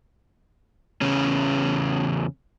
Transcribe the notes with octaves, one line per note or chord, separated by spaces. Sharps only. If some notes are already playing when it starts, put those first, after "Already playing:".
E2 C#3 C#4